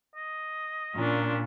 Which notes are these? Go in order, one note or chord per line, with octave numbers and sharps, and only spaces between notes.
D#5
A#2 C#4 D4